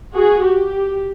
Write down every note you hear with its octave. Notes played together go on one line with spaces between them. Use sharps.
F#4 G#4
G4